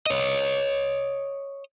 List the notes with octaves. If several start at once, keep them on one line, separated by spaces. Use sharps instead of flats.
C#5 D#5